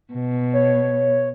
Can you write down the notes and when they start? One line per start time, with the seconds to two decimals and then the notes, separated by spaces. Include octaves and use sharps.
0.12 B2
0.53 C#5